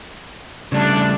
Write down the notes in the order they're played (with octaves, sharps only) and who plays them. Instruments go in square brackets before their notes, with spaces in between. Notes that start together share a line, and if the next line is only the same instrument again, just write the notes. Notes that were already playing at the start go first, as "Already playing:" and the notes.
[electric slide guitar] C#3 G3 A3 [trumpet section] D4